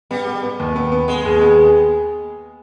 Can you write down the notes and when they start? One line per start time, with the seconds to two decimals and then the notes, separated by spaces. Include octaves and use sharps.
0.11 G3 B3
0.27 B3
0.43 B3
0.59 D#2
0.76 B3
0.92 B3
1.08 G#3 B3
1.25 D#2
1.41 B3